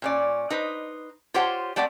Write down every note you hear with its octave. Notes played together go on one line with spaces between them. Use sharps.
A#2 C#4 D5
D#4 B4 C5
F4 G4 C5 C#5 F#5
G3 A3 C4 D5 F#5